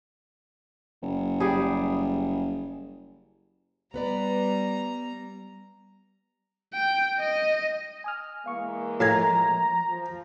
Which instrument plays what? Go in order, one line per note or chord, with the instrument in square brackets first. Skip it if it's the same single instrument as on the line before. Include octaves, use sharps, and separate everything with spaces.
[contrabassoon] F#1
[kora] G3 G#4
[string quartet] G3 A#5 [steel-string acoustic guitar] B3 B4 D5
[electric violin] G5
D#5
[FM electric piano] G#5 D#6 F6
[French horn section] E3 G#3 A#3 [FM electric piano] F5 C#6
[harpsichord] A2 F5 G#5 [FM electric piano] F3 [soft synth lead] A#5
[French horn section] F3